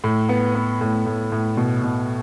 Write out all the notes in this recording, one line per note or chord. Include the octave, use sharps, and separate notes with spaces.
A2
B3
B3
A2
A2
A2
B2
B2